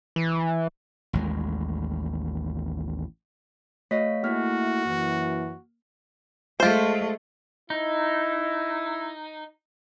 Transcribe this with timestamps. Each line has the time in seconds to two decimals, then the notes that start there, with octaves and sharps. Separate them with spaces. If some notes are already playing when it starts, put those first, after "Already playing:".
0.16 E3
1.13 A1 D#2 G#3
3.91 A3 F#4 C#5 D#5 F5 B6
4.24 A3 A#3 D#4 E4 F#4 G#4 E5 F6
4.85 F#2 E3
6.60 G#3 A3 F4 C5
7.70 D#4 E4